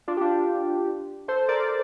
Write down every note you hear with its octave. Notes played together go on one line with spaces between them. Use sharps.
D4 F4
G4
D4 F4
A4 C5
A#4 D5